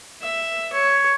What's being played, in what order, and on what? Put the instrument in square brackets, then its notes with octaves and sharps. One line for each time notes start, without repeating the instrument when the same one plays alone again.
[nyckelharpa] E5
C#5